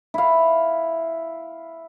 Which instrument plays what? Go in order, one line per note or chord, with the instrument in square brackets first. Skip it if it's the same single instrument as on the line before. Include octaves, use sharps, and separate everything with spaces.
[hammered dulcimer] E4 F5